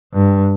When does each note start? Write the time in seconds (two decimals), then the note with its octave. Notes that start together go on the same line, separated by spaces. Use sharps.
0.14 G2